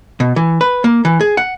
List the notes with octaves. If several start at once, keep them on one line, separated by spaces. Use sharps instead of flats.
B2
E3
B4
A#3
E3
G#4
F#5